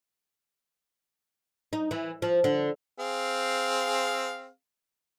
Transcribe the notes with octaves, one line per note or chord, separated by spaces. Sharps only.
D#4
E3
F3
D3
C4 G#4 F5